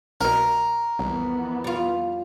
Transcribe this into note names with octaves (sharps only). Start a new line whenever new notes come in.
C2 B2 A#4
C2 F2 E3 B3
G3 F4